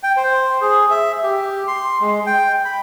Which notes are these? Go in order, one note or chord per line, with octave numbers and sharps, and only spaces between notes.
G5
C5
G#4
E5
G4
C6
G#3
G5
B5